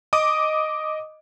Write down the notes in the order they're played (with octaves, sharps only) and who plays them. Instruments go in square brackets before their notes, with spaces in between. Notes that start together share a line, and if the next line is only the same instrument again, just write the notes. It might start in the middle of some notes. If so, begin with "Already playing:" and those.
[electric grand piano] D#5 D6 D#6